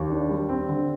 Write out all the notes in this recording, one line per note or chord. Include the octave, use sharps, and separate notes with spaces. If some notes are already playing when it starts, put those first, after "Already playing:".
Already playing: D#2
D4
G3
C4
D3